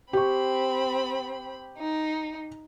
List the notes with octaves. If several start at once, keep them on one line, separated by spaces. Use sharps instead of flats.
C4 G4 B5 C#6
D#4